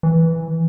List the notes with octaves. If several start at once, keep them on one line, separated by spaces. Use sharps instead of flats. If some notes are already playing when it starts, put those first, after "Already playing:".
E3